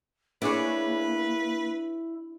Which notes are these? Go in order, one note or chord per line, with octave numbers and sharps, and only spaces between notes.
A#3 D4 E4 G#4 B4 C#5